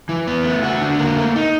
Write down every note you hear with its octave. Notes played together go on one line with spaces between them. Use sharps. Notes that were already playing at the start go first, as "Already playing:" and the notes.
E3
B3
A3
F#4
D3
A#3
A3
D#4